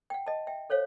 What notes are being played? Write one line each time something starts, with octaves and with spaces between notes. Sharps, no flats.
F#5 G5
D#5 A5
E5 G5
A4 C5 C#5 F5